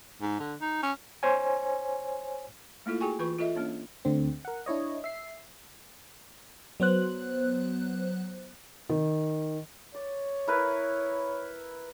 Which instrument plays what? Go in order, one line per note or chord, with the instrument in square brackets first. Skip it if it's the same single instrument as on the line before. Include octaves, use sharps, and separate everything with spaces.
[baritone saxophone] G#2
D3
D#4
C#4
[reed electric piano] C5 C#5 G#5
[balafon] A3 A#3 E4 F4 A4
F#4 G#4 G5 G#5 C#6
E3 F4 B4 C#6
F4 A4 D#5 E5
A#3 C#4 D4 C#5
[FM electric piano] D2 D3 C4
A#4 F#5
D4 E4 C#5 D#5
E5 C7
F#3 B3 C5 F#6
[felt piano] D#3
[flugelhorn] C#5 [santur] D5
[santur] E4 A#4 B4